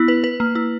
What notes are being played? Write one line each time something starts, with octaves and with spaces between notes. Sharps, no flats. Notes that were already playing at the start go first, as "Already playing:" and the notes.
Already playing: B3 E4
B4
B4
A#3
E4